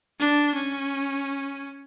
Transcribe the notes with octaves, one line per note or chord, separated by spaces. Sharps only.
D4
C#4